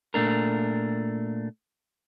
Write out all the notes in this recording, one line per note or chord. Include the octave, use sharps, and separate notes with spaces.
A#2 A3 D4 A#4